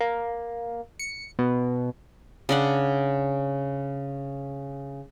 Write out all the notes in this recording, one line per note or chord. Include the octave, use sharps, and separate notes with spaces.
A#3
C#7
B2
C#3 D4 F#5